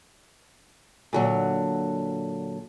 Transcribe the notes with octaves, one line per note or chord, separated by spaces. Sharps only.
A#2 D3 F#3